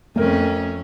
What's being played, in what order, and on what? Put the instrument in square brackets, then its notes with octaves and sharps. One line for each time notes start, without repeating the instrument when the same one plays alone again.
[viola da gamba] F2 C4 C#4 [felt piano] A3 A#4